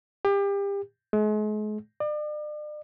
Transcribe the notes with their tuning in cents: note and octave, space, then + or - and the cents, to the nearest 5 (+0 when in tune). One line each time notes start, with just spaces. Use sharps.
G4 +30
G#3 +40
D5 +40